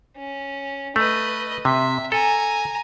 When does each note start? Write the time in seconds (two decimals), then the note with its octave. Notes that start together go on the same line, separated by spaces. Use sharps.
0.17 C#4
0.96 A3 B4 D#5
1.65 C3 E5
2.12 A4 G#5 A#5